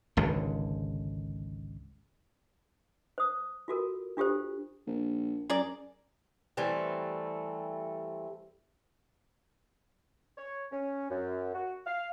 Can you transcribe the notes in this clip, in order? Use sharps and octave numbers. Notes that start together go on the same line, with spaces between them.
G#1 C#2 D3
C5 D#6
F4 F#4 A4 A#4
D4 F4 G4 A4 C5
A#1
F#2 G#4 A#4 D5
E3 G3 A3 C4
C#5
C#4
F#2
F#4
F5